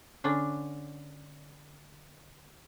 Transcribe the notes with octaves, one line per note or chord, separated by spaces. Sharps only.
D3 C#4 D4